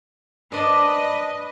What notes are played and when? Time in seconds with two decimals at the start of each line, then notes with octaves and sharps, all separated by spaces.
0.52 D4 B4 C5 D#5